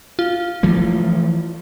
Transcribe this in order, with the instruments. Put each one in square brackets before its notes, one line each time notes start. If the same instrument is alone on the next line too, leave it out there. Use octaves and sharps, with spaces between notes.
[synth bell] F4
[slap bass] E3 F3 A3